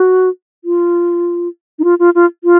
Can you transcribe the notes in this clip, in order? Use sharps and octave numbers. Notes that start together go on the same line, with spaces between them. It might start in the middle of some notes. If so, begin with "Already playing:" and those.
Already playing: F#4
F4
D#4
F4
F4
F4
F4